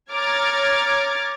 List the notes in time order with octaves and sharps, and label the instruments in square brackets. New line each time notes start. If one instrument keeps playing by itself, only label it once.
[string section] C#5 A#5 D6 F6 G#6 A6